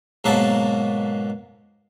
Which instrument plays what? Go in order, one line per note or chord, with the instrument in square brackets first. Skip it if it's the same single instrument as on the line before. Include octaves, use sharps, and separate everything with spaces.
[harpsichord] G#2 B2 F#3 A#3 F#4 A5